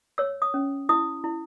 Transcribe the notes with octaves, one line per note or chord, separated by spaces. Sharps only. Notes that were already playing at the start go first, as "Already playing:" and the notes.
C#5 E6
D#6
C#4
E4 D#6
E4